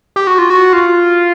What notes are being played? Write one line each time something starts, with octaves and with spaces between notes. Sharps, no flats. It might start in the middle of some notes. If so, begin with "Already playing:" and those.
G4
F#4
F4
F#4
F4